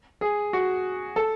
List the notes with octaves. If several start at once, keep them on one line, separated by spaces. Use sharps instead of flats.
G#4
F#4
A4